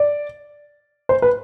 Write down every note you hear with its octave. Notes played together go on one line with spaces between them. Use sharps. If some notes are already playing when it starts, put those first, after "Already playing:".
Already playing: D5
C5
B4